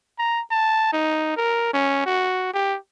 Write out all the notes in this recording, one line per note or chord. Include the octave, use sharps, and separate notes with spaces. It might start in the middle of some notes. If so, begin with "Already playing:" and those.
A#5
A5
D#4
A#4
C#4
F#4
G4